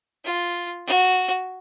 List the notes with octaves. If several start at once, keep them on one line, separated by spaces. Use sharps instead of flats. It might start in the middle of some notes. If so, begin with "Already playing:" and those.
F4
F#4